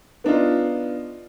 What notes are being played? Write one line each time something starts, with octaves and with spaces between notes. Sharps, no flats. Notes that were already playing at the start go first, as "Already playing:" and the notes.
B3 D4 D#4 F4